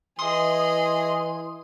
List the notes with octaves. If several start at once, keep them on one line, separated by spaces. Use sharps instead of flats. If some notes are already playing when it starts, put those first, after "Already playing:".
E3 G#4 D#5 C6 D#6